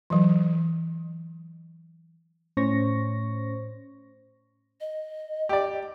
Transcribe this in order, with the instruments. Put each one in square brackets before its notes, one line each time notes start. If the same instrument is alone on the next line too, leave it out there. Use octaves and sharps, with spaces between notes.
[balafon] E3 F#3
[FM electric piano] A2 C#4 C5 C#6 A#6
[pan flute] D#5
[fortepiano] G4 D5